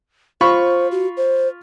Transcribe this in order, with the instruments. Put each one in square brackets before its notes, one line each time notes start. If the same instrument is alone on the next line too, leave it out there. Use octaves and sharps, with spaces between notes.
[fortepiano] F4 B5 C#6 [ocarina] C5
[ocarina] F#4
C5